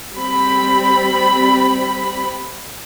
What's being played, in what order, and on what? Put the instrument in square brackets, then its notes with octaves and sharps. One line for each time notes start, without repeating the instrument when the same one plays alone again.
[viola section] G3 C4 B5